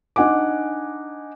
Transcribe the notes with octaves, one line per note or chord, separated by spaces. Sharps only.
D4 D#4 F#5 G#5 D6